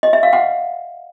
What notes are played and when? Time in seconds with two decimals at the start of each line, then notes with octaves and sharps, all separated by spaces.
0.03 D#5
0.13 E5
0.23 F5
0.33 F#5